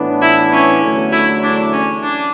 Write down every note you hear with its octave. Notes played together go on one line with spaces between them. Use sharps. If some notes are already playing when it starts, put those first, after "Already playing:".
Already playing: A2 E3 B3 D4
E4
C#4
E2 D3 F#3 A3
E4
D4
C#4
D4